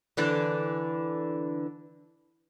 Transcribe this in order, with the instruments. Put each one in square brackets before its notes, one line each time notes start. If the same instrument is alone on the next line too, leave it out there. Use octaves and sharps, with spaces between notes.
[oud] D3 E3 D4